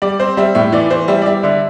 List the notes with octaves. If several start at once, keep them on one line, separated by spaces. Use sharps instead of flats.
G3 D5
C4 C5
G3 E5
A2 E5
E3 D5
E3 C5
G3 E5
D5
G3 E5
D3 E5